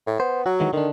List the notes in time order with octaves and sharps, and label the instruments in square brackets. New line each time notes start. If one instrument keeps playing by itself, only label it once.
[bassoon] A2
[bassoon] B3 [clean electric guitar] C5
[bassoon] F#3 [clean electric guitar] F#4
[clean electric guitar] D#3 E3 G#3
[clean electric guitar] D3 D4 [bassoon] D#3